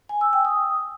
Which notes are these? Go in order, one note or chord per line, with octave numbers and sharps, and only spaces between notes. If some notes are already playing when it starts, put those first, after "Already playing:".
G#5
E6
G5
D#6